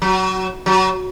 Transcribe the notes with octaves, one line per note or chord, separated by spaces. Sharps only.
F#3
F#3